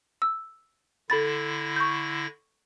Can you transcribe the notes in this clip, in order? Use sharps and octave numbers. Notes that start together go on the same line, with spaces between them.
E6
D3 E4 A4 B5 A6 A#6
C#6 G6